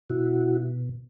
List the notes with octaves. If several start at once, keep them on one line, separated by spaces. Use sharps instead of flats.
B2 E4 F#4